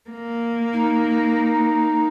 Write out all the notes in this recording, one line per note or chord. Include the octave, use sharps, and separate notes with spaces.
A#3
D#4